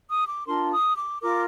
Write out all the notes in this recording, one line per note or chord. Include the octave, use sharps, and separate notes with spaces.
D#6
D6
D4 F4 A#4 C6
D#6
D6
F4 A#4 D6